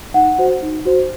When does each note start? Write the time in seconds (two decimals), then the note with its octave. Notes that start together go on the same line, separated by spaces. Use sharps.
0.14 D#4 F#5
0.38 F#4 C5
0.62 D#4
0.85 F#4 C5